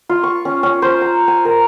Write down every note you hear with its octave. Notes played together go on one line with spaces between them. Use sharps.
F4
C#6
C#4
C#4
C5
A#5
G#5
A#4